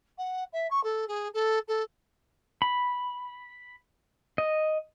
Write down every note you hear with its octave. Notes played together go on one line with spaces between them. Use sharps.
F#5
E5
C#6
A4
G#4
A4
A4
B5
D#5